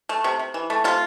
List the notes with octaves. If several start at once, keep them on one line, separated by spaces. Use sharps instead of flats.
A3
C3
C3
E3
A3
C3 F4